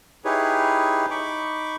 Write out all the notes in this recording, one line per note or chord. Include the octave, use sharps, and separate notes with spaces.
D#4 E4 G4 G#4 B4 C#5
D#4 B5 C#6 D6